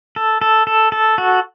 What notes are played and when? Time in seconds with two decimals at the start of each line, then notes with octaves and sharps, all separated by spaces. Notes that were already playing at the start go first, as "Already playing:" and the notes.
0.16 A4
0.41 A4
0.67 A4
0.92 A4
1.18 F#4